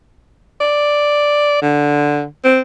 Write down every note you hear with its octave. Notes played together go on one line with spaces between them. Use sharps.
D5
D3
C4